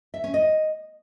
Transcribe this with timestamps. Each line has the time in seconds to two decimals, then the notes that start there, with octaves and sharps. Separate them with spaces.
0.14 E5
0.24 C#4
0.34 D#5